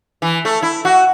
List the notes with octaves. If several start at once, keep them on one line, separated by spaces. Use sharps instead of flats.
E3
A3
E4
F#4